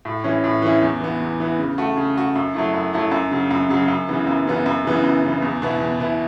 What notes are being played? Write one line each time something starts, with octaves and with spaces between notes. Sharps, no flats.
A2
E3 C#4 E4
A2
E3 C#4 E4
E2
E3 B3
E2
E3 B3
C#3
A3 F#4
C#3
A3 F#4
F#2
F#3 A3 E4
F#2
F#3 A3 E4
F#2
C#3 F#3
F#2
C#3 F#3
F#2
C#3 E3 B3
F#2
C#3 E3 B3
F#2
C#3 E3 B3
F#2
C#3 E3 B3
E2
B2 B3 E4
E2
B2 B3 E4